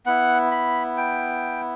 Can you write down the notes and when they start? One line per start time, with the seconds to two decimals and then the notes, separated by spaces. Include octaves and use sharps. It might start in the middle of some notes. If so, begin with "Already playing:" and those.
0.06 B3 E4 F#5
0.51 B5
0.97 G5